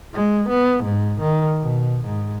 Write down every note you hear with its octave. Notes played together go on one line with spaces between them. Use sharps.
G#3
B3
G#2
D#3
B2
G#2